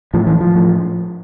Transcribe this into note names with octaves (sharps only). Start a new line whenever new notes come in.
A2 F3
E3
F3
A2